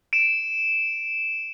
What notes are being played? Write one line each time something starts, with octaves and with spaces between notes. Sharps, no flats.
D7 E7